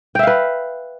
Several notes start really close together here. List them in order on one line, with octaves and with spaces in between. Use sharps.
G5 E5 F5 B4